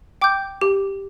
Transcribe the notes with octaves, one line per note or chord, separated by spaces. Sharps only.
G5 D6 G6
G4